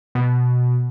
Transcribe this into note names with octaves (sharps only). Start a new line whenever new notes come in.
B2